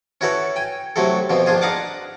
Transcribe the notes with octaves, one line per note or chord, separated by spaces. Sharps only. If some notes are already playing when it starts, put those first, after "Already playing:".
C#4 E4 F#4 A4 B4 C#5
G5 G#5
C3 F#3 A3 E4 A4
F2 B2 F3 C4
A#1 F3 D4 F4 G#5
D4 D#4 F5 F#5 A5 D6